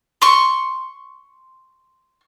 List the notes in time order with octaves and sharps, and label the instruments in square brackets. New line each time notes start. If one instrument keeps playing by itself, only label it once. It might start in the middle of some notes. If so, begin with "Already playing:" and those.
[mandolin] C6 C#6